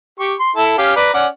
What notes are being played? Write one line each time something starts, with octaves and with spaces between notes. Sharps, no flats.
G4 C#6
C6
E4 A4 A5
C#4 G4 F5
B4 D5 A#5
C#4 D5 F#5